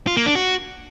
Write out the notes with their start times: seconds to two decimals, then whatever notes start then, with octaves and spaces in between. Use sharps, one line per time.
0.07 F4
0.17 A#3
0.26 D4
0.35 F#4